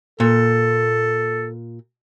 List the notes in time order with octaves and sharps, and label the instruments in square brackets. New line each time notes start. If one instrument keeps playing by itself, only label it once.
[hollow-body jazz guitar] A#2 [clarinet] A4